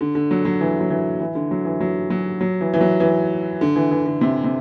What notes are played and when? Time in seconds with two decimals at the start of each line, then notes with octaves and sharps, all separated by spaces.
0.01 D3
0.15 D3
0.31 F#3
0.45 F#3
0.61 E3
0.80 F#3
0.90 E3
1.20 E3
1.35 D3
1.51 F#3
1.65 E3
1.80 F#3
2.10 F#3
2.41 F#3
2.61 E3
2.74 E3
2.81 F#3
3.00 E3
3.61 D3
3.76 E3
3.91 E3
4.06 D3
4.21 C3
4.44 C3